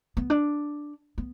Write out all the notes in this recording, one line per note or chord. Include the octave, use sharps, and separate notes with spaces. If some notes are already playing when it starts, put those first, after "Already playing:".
B3
D4
B3